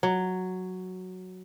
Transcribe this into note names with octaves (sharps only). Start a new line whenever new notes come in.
F#3